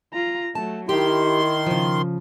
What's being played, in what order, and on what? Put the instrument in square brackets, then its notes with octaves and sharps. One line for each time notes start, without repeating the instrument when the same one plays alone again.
[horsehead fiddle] F4 A#5
[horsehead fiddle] F#3 A3 [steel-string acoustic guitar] A5
[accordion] D#3 C6 [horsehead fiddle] E4 [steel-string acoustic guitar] G4
[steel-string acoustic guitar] C#3 F3